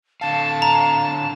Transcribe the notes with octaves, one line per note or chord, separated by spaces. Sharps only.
D3 F5 A5
A#5